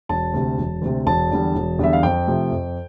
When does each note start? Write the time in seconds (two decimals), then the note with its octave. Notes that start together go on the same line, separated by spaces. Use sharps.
0.09 E1 A5
0.34 D2 C3
0.58 E1
0.82 D2 C3
1.06 E1 A5
1.31 E2 D3 G3
1.55 E1
1.79 E2 D3 G3 E5
1.93 F5
2.03 F2 G5
2.27 C3 F3 A3
2.51 F2